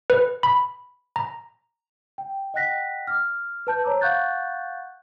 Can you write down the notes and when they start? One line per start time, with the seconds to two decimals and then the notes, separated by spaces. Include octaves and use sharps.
0.10 B4
0.43 B5
1.16 A#5
2.18 G5
2.54 D#5 F#5 G5 F#6 A#6 B6
3.07 D6 F6
3.67 B4 A5 G6
3.84 C5 C#5 A#5 D6 E6
4.01 F5 F#5 C#6 F#6 G6 A6